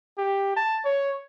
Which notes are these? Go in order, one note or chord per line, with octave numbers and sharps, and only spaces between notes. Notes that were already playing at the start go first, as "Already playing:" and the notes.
G4
A5
C#5